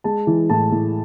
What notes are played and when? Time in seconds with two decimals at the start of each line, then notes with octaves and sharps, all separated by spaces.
0.04 G#3 A5
0.27 E3
0.50 A2 A5
0.72 A2